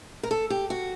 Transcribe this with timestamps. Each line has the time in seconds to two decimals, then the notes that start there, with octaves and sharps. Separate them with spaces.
0.23 A#4
0.31 A4
0.50 G4
0.70 F#4